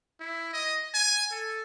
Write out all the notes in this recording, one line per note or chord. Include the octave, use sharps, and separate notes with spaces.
E4
D#5
G#5
A4